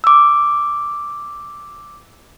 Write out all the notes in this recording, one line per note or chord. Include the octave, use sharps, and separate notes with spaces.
D6 E6